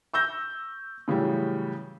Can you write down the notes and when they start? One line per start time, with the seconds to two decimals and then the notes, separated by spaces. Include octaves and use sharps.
0.14 C#6 E6 G6 A#6
1.08 A2 C#3 E3 F#3 G3